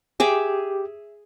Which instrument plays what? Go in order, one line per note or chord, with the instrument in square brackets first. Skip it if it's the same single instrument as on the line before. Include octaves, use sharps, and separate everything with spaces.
[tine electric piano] G4 [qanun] G#4 E5 D6